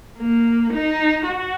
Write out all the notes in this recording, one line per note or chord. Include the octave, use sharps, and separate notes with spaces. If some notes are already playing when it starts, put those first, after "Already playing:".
A#3
D#4
F#4